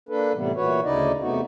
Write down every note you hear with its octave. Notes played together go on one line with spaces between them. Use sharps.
A#3 D4 A4 B4
A2 C3 E3 G3 B3
A#2 E3 F#4 B4 C#5
D2 C#3 D#4 E4 D5 D#5
E2 C3 A3 B3 D#4 F#4